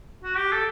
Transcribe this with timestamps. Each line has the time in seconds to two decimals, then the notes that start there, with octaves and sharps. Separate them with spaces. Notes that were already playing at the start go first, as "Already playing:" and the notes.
0.23 F#4
0.37 G4
0.52 A4